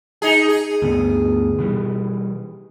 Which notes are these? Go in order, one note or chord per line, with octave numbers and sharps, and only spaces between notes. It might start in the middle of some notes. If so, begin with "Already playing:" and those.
D#4 G#4
G#4
D2 G2 B3
B2 E3 G3